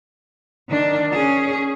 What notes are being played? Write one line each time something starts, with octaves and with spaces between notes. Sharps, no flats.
D#3 D4
C#4 G#4